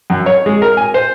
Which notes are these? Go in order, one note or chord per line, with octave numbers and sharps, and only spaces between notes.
F#2
C#5
G#3
A#4
G#5
C5